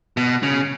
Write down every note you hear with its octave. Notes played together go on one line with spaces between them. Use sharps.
B2
C#3